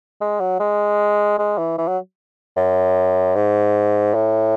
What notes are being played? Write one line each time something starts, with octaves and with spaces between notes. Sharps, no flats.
G#3
F#3
G#3
G#3
E3
E3
F#3
F#2
G#2
A2